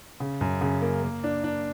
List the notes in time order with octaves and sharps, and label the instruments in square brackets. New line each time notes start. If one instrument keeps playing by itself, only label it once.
[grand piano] C#3
F#2
C#3
A#3
A#3
D4
D4